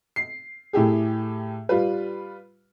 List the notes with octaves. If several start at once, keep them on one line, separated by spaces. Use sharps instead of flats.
C7
A2 E4 G4 G#4
G3 F4 B4